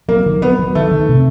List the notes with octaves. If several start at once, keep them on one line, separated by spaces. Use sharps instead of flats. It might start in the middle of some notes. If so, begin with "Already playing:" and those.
F#3 A#3
D#3
F#3 B3
F#3
D#3 A3
D#3
C3